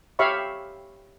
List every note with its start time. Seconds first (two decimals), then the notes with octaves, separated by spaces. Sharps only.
0.19 G4 C#5 E5 F5 B5 C#6